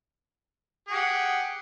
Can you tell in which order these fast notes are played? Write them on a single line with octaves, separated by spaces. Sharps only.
G#4 G4 F#5